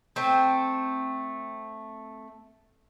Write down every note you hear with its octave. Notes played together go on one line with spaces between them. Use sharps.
A3 C4